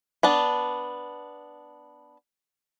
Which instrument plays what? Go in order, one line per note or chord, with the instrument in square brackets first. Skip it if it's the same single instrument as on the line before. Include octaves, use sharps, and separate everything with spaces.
[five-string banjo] B3 D4 A5